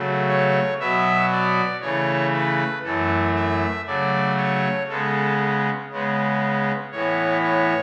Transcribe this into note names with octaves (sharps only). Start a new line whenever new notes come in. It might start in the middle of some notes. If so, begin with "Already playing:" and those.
Already playing: C#3 F#3 A3
C#5
B2 F#3 B3 E5
D5
C#3 E3 A3 C#5
B4
F#2 E3 A3 A4
E5
C#3 F#3 A3 D5
C#5
C#3 G#3 B3 A4
C#3 G#3 B3
A2 E3 B3 C#5
C#5